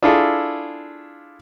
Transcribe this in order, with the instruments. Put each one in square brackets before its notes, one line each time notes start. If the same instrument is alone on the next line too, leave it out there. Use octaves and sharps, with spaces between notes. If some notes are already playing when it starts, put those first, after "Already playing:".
[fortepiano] D4 E4 F4 G#4 A4